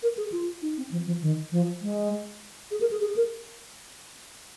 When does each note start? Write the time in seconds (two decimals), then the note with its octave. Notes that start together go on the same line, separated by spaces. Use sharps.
0.03 A#4
0.17 G#4
0.32 F4
0.62 D#4
0.77 C4
0.92 F3
1.07 F3
1.22 D#3
1.52 F3
1.82 G#3
2.71 G#4
2.81 A#4
2.91 G#4
3.01 G#4
3.16 A#4